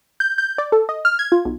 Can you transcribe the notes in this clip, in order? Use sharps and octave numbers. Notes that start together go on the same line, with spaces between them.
G6
G6
D5
A4
D#5
F6
G#6
F4
B1